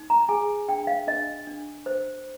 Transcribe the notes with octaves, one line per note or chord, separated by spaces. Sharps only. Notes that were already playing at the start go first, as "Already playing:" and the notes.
Already playing: D#4
A#5
G#4 G#5
D4 G5
F5
D4 D#5
D4
C5